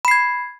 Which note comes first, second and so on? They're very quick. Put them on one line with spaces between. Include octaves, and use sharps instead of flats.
B5 C7 G#6